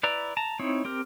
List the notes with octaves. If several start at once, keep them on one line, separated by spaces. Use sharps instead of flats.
E4 B4 D5 A#5
A5 A#5
C4 D#4 E4 C#5
C4 G4 A#4